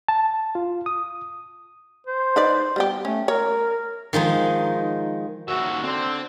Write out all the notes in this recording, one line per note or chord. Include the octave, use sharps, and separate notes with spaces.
A5
F4
D#6
C5
D#4 B4 D5
G3 B3 G4
A3 C#4
A#4 C#5
D#3 F3 G#3 D#4
D#2 F#4 E5
D3 C4